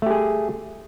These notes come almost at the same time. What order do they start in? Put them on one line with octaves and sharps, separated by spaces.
A3 G4 G#4